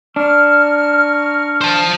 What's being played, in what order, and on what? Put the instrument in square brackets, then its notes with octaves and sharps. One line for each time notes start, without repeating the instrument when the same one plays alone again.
[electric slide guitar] D4 [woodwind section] A#5 C#6 F6
[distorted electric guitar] C5 A5